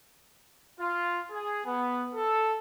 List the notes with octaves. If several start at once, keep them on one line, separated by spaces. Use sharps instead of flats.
F4
G#4
B3
A4